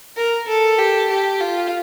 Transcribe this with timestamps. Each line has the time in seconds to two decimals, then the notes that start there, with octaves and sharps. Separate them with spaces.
0.16 A#4
0.48 A4
0.78 G4
1.09 G4
1.40 F4